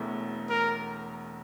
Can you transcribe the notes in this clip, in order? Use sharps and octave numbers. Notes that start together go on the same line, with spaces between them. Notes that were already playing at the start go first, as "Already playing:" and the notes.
Already playing: E1 E2 E3 A3
A#4